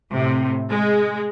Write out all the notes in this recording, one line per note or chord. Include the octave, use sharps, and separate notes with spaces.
A2 C3
G#3